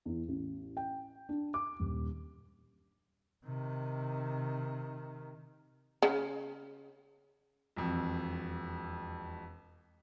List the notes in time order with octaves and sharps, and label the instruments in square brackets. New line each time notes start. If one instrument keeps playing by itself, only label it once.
[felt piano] E2
A1
G5
D4
D6
D#1
[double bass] C3 D#3
[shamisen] C#3
[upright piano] E1 F2